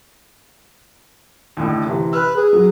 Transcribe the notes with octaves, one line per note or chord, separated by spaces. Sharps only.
D#2 A2 D3
C3 E3
B4 E6 F6
G#4
F#3